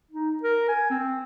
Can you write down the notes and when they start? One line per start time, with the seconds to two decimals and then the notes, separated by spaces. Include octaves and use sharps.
0.11 D#4
0.43 A#4
0.69 G#5
0.90 C4